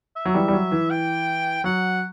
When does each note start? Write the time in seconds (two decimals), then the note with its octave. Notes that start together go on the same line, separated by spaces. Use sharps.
0.16 E5
0.25 F#3
0.34 E3 G3
0.48 G3
0.53 F#3
0.72 E3
0.90 G5
1.64 F#3 F#5